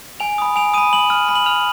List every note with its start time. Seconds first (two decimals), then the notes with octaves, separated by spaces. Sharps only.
0.20 G#5 F7
0.38 B5 D#6
0.56 G#5 F7
0.74 B5 D#6 D#7
0.93 B5 F#7
1.10 F6
1.28 B5
1.35 F#7
1.46 F6 F7